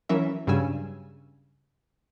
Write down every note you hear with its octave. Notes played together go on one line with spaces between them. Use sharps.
E3 F#3 C#4 A#4 E5
G2 C#3 F#3 G3 G#5 E6